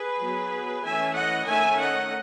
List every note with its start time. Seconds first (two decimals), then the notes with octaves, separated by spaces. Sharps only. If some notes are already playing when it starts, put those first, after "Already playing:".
Already playing: G#4 B4
0.20 F#3 B3
0.84 E3 A3 C#4 E5 G#5
1.15 D#5 F#5
1.48 D#3 A3 C#4 E5 G#5
1.79 D#5 F#5